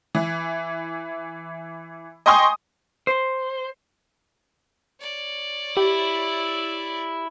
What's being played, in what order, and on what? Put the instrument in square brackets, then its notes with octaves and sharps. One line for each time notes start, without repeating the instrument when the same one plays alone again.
[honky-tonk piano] E3
D#5 G5 G#5 C6 C#6 D#6
[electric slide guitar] C5
[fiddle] C#5 D5
[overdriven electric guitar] E4 [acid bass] G4